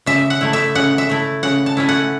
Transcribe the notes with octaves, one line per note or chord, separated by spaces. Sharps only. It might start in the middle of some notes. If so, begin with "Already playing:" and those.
C#3 E5
F#5
A3 E4
E5
C#3 F#5
E5
A3 E4
C#3 F#5
A5
A3 C#4 E4
F#5